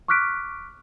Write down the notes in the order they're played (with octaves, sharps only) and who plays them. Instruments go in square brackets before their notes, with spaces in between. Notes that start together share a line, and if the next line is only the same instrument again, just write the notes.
[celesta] C#6 D6 F6 F#6 B6 D7